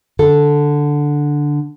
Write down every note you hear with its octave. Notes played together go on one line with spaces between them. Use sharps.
D3 A4